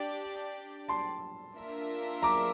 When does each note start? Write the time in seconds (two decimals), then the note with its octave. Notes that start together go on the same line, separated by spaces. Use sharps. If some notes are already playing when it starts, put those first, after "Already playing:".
Already playing: D4 G4 D5
0.89 A5 C6
1.55 A#3 D4 F4 A#4 E5
2.22 A#5 D6